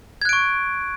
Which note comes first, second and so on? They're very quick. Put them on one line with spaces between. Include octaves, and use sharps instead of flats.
G#6 F#6 D7 C#6